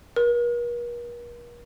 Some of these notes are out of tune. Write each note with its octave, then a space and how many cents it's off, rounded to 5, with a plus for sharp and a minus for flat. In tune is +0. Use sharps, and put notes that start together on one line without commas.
A#4 +45